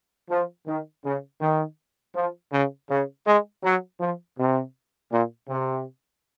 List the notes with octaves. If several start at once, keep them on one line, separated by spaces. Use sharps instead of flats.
F3
D#3
C#3
D#3
F3
C#3
C#3
G#3
F#3
F3
C3
A#2
C3